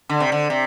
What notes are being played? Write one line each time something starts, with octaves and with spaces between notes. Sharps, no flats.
D3
C3
D3
C3